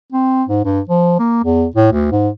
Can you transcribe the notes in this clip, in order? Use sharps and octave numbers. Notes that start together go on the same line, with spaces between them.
C4
G#2
G2
F3
A#3
E2
A2
D2
G#2